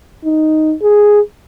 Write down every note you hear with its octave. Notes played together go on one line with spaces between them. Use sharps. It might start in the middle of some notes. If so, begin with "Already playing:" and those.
D#4
G#4